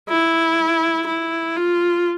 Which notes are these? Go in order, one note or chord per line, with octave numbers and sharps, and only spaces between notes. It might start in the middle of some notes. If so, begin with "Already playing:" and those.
E4
E4
F4